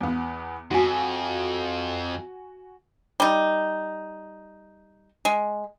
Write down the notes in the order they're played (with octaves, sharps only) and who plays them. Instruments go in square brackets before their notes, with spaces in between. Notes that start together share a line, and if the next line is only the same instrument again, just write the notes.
[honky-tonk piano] E2 B3
[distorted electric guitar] F2 [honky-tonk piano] F#4 G#5
[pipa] G3 D#4
G#3